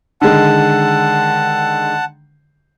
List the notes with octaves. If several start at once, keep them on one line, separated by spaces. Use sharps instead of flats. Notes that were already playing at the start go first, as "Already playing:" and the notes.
D3 D#3 G#3 F#5 A5